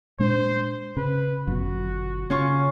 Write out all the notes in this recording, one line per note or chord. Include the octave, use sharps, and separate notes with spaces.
A#2 G#3 D4 C5
C#3 B4
G1 F#2 B2 F#4
C#3 C#4 F4 C#6